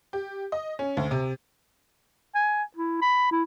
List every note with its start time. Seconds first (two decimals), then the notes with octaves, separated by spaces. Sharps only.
0.13 G4
0.52 D#5
0.79 C#4
0.97 D2
1.11 C3
2.35 G#5
2.76 E4
3.02 B5
3.32 E4